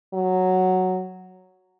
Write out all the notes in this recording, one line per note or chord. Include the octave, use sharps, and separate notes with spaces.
F#3